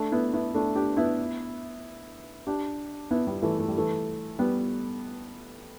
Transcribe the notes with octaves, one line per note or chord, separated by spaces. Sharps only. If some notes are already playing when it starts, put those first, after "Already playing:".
Already playing: A3 D4
B3 E4
B3 E4
A3 D4
D4 G4
B3 E4
D4 G4
B3 E4
G3 B3
E3 A3
A3
G3
E3 A3
G3 B3